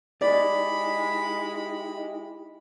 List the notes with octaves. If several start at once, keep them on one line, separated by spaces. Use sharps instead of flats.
G#3 D#4 E4 G4 D5 B5